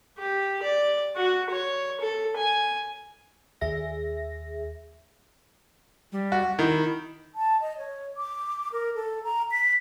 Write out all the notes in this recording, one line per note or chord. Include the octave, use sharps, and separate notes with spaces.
G4
D5
F#4
C#5
A4
G#5
D#2 G#4 E5 A#6
G3
F#4
D#3 E4
A5
D#5
C#5
D6
A#4
A4
A#5
B6